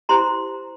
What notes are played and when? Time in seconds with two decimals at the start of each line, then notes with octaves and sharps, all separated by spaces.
0.09 E4 G4 C5 A#5 C6